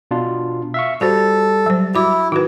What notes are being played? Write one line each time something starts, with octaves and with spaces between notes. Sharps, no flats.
B2 D4 F4
E5 F5 C#6
G3 F#4 A4 C5
F#3 C5
E4 F#4 D6
D#3 E4 F#4 B4